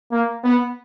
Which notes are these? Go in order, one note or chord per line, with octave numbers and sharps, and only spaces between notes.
A#3
B3